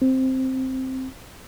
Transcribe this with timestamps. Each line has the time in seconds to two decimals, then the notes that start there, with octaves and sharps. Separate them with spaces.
0.02 C4